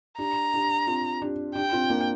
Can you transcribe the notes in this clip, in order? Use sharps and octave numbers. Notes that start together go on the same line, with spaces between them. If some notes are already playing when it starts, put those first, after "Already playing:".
D4 G4 A#5
D4 G4
C4 F4
D4 G4
D4 G4 G5
C4 F4
A#3 D4